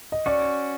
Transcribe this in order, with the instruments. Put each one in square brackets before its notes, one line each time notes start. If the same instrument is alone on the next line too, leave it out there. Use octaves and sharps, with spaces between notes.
[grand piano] D#5
[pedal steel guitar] C#4 F#4 [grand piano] D5